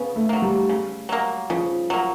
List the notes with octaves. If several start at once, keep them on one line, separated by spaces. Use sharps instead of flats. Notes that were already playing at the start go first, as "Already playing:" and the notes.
Already playing: C#3 B3
A3
F#3 A#3
G3
C#3
F#3 A#3
C#3 F3
F#3 A#3